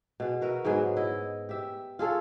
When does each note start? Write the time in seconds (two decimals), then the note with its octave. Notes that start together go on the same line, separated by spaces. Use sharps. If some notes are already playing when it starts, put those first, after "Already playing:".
0.20 B2 G#4
0.41 F#4 A#4 B4 E5
0.65 G#2 F#3 B3 G#4
0.96 E4 D#5
1.49 G4 E5
1.99 F4 G#4 A4 C#5